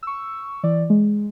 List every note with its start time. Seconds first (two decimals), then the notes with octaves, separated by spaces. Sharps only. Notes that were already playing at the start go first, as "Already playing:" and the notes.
0.03 C#6 E6
0.63 E3 D5
0.90 G#3